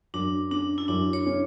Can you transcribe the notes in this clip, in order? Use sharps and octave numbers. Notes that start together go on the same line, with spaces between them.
F#2 D4
C#4 D4
E4
F#2 D4
C#5
C#4